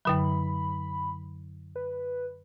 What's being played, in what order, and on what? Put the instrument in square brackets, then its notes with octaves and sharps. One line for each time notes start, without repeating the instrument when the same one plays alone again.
[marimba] F#2 D3 F#3 [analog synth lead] B5
[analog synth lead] B4